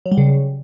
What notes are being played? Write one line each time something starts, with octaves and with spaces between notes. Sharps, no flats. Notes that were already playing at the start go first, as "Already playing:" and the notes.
F#3
G3
C#3